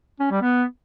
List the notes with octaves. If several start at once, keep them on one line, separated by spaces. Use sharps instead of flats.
C#4
G3
B3